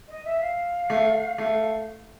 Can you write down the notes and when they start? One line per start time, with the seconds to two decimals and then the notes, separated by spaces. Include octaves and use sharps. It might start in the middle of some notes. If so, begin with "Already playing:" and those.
0.08 D#5
0.25 E5
0.41 F5
0.90 A3
1.38 A3